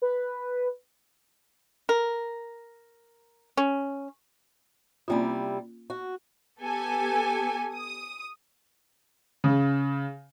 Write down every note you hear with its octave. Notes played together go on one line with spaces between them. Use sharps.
B4
A#4
C#4
C3 G3 A#3 C#4 E4 F4
F#4
B3 G4 A4 G#5
D#6
C#3